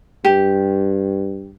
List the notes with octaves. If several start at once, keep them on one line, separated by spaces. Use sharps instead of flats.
G2 G4